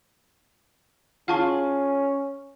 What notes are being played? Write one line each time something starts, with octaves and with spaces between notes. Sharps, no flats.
C#4 F4 G#4 F#5 A5 C#6